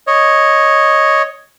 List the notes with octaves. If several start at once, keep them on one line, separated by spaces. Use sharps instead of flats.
C#5 D#5